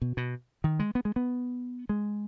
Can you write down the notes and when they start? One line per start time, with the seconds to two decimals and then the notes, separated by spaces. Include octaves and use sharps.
0.02 B2
0.17 B2
0.64 D#3
0.79 G#3
0.95 B3
1.05 G#3
1.16 B3
1.89 G#3